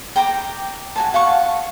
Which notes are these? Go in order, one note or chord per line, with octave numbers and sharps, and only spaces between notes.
G5 A#5 D6
F#4 G#5 A5
F5 F#5 A5 C#6